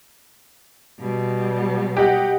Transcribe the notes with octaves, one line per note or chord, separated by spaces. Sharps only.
B2 G3
G4 D#5 F#5